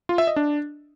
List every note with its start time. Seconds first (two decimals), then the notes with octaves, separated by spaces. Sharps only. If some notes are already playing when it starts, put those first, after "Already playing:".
0.09 F4
0.18 E5
0.27 D#5
0.36 D4